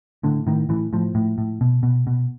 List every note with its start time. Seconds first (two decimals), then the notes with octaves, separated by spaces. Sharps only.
0.23 A2 D3
0.47 A2 D#3
0.69 A2 E3
0.93 A2 F3
1.15 A2
1.38 A2
1.61 B2
1.83 B2
2.07 B2